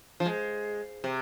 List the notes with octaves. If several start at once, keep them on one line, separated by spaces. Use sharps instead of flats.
F3
G#3
C3